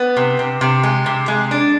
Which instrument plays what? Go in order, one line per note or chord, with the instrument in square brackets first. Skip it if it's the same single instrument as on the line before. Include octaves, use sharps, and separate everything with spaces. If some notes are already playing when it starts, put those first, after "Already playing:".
Already playing: [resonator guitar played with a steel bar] B3
C3
C3
C3
G#3
C3
G#3
D4